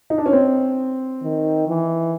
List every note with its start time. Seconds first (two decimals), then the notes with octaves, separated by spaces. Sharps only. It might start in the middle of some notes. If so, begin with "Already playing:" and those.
0.10 D#4
0.18 D4
0.26 C#4
0.33 C4
1.23 D#3
1.68 E3